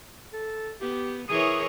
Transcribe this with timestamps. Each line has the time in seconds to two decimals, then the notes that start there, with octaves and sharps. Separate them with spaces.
0.33 A4
0.81 B3 G4
1.29 E3 G#4 A#4 C#5 C#6 D#6